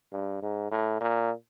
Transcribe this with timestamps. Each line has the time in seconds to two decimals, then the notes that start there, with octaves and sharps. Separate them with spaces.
0.12 G2
0.42 G#2
0.71 A2
1.01 A#2